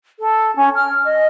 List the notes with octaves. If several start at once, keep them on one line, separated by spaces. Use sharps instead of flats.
A4
C#4
F6
D#5